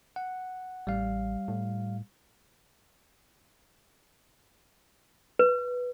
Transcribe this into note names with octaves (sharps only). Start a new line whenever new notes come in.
F#5
A1 G3 F5
A2
B4